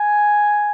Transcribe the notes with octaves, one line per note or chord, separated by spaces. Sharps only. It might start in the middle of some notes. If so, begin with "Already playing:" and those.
Already playing: G#5